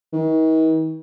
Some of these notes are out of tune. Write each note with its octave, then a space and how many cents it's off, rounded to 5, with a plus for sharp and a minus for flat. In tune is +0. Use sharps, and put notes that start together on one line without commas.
D#3 +45